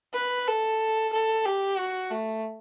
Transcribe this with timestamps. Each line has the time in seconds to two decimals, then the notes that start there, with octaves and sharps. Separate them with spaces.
0.14 B4
0.48 A4
1.13 A4
1.46 G4
1.78 F#4
2.11 A3